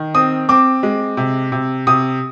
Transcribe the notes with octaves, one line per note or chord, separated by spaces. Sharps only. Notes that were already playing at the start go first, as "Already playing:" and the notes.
Already playing: D#3
C4 D#6
C4 D6
G#3
C3
C3
C3 D#6